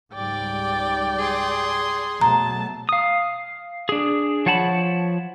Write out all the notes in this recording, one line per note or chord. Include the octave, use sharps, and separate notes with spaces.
C#2 G#2 G3 D5 G5
G#4 C6
B2 F#3 A3 A5 A#5
F5 D#6
D4 G#4
F3 C#5 F#5 A5 B5